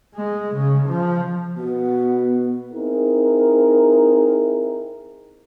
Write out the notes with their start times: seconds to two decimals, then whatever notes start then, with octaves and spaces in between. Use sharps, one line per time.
0.15 G#3
0.54 C#3
0.88 F3
1.57 B2 B3
2.73 C4 D#4 E4 G#4 A#4